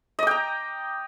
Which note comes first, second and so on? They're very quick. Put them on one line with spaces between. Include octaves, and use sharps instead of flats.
D#5 D6 G5 A#5